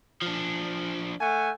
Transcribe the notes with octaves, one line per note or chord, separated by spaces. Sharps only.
F3 D4
A3 F#5 G#5